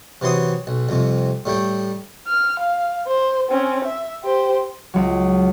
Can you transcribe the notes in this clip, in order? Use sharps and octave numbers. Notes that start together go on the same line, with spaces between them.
C3 E3 F#3 C6 D#6
B1
C2 F2 C3
A2 G3 A3 G5
F6
F5
C5
C4 C#4
E5
G4 C5
C#2 F#3